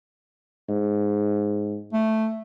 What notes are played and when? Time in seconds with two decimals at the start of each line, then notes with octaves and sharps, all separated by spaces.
0.69 G#2
1.93 A3